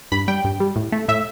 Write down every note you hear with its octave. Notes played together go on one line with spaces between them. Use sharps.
G2 B5
G3 G5
G2
G3
A2
A3
A2 E5